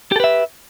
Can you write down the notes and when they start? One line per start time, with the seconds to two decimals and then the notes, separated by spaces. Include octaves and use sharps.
0.12 G4
0.16 A4
0.20 B4
0.24 E5